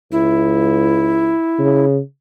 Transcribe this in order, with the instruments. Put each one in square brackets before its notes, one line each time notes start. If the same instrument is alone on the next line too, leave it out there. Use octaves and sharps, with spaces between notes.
[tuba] C#2 [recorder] E4
[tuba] C#3